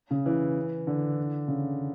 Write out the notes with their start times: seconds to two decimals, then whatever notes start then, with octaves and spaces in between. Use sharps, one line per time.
0.11 C#3
0.26 E3
0.87 D3
1.48 C#3